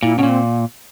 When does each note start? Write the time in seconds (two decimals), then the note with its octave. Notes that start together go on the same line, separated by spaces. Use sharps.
0.03 A#2 E4
0.17 B2 C#4
0.23 A#2
0.29 C4